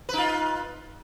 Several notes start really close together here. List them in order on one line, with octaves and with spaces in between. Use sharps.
B4 D#4 F4